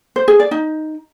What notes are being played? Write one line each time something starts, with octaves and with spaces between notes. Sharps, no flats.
C5
G#4
D5
D#4